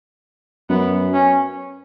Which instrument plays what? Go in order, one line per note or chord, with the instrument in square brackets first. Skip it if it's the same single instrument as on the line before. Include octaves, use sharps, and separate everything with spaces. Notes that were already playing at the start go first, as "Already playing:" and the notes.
[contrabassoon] F#2 [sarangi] B3
[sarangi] C#4